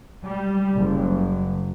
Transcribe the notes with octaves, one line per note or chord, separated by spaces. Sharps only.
G3
F#1